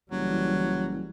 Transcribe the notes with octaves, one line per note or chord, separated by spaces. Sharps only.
F#1 E3 F#3 G3